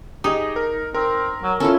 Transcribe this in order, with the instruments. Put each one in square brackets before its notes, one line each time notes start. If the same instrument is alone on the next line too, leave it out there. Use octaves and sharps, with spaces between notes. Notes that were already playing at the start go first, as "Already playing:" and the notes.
[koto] D#4 [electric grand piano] G4 G#4 D#5
[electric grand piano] A#4
[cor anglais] C4 [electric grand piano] A#4
[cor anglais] F#3
[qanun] C#4 E4 F4 [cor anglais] A4